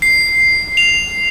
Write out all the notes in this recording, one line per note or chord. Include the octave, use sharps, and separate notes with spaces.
C7
F7